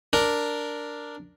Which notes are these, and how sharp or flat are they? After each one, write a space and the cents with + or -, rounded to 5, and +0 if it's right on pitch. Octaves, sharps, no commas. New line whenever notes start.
D4 +0 A#4 +0